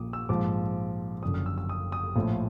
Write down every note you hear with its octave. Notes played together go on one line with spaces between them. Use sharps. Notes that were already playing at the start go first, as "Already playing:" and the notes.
Already playing: A#1 A#2 F3 D6 D#6
E6
A#1 G#2 F3 D6
F#1 F#2 D3 F3 D#6
F6
E6
E6
D#6
D#6
A#1 A2 F3